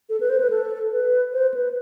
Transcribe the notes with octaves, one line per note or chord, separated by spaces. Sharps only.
A4
B4
C5
B4
A4
B4
C5
B4